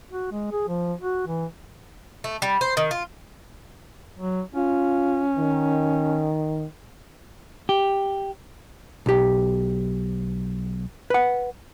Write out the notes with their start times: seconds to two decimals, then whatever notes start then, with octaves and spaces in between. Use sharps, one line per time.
0.11 F#4
0.31 G#3
0.52 G#4
0.68 F3
0.99 F#4
1.27 E3
2.24 A3
2.42 G3
2.61 C5
2.77 D#3
2.91 F4
4.19 F#3
4.54 C#4 F4
5.37 D#3
7.69 G4
9.06 B1 G4
11.10 B4 F#5